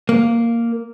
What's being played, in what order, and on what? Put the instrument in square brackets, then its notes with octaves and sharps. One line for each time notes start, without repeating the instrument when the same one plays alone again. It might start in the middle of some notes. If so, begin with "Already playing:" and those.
[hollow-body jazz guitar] A#3